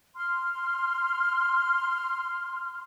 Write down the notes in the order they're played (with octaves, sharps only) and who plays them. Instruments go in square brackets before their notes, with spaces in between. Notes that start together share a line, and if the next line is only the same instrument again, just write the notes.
[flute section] C6 F6